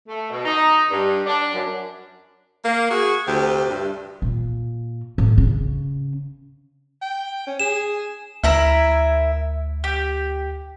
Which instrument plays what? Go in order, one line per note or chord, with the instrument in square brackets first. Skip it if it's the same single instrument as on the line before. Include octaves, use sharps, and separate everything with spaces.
[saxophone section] A3
B2
D#4
G2
D4
F#2
A#3
F#4 G#4
D2 C3 G4
G2
[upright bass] A#2
A2
C#3
[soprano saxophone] G5
C#4
[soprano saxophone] G#4 [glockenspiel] E7
[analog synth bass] D2 [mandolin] E4 A#4 E5
[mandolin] G4